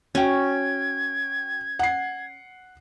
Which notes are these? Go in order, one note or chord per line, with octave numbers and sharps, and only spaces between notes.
C#4 F#4 G5 G#6
F#5 C7